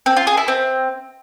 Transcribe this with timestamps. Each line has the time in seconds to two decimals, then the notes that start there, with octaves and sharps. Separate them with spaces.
0.06 C4
0.17 F4
0.27 G#4
0.37 E4
0.48 C4